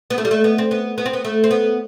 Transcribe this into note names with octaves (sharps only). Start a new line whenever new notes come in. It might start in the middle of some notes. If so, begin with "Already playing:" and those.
B3
A3
G3
A3
B3
C4
B3
B3
C4
B3
A3
C4
B3